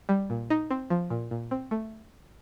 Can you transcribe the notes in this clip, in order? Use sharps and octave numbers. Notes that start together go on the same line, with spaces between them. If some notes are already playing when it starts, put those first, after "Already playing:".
G3
A#2
D#4
C4
F3
A#2
A#2
C4
A3